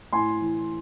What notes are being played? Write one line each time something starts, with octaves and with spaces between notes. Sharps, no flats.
A2 G#5 C6
E3